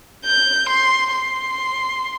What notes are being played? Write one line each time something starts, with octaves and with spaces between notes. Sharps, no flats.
G6
C6
C6